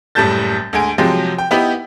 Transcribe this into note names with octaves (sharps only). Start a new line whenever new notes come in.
F#1 A2 G3 A5 G6 A6
D2 G#3 G#5 D7
C3 F3 F#3 G#3 G4
G5
B3 D#4 E4 G4